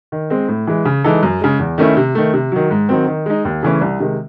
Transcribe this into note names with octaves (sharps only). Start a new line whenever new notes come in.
D#3
G#3 C4
A2
E3 G#3
C#3
E3 G#3 D#4 A4
F#2
C#3 G#3
E2
D#3 A3 C#4 E4
C3
D#3 A3
C3
D#3 F#3
G#2
D#3 F#3 C4
D#3
G#3 D#4
D#2
C#3 E3 A3 C#4
C2
C3 D#3 G#3